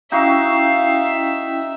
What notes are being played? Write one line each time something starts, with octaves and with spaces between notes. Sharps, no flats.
C#4 D#4 E4 F#4 E5 F5 G5